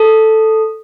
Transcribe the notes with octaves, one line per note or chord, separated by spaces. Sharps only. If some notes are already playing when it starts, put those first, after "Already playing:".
Already playing: A4